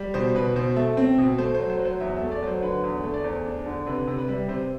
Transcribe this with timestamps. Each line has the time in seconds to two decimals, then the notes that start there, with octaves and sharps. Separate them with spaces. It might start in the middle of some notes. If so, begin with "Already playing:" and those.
Already playing: G3
0.14 B2 C5
0.35 B2 B4
0.56 B2 C5
0.76 A3 E5
0.97 C4
1.18 B2
1.38 A3 C5
1.54 C5
1.60 F#3
1.70 C5
1.79 F#3
1.85 C5
2.00 E2 E5
2.17 A3 E5
2.32 D5
2.43 F#3 C5
2.62 D3 B4
2.84 E2
3.03 A3
3.14 D5
3.24 E2 C5
3.46 D4
3.66 D3
3.87 C3 B4
4.07 C3
4.18 B4
4.28 G3
4.48 C3 C5